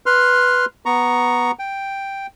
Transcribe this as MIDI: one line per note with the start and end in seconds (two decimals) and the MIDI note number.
0.06 0.65 71
0.06 0.65 84
0.06 0.65 89
0.86 1.51 59
0.86 1.51 82
0.86 1.51 85
1.59 2.27 79